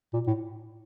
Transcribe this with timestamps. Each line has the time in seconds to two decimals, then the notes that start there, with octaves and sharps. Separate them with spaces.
0.14 A#2
0.27 A2